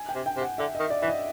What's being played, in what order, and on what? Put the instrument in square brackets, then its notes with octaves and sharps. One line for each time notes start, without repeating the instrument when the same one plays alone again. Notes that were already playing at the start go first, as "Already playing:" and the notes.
Already playing: [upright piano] G#5
G5
[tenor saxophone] C3
[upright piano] G5
[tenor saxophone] C3
[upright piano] F#5
[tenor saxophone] D3 [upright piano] E5
[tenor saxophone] D#3 [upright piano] D#5
[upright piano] D5
[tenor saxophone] E3 [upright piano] E5
[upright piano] D#5